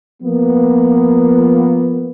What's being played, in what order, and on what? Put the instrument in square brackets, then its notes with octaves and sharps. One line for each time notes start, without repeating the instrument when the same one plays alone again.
[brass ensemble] F3 A#3 B3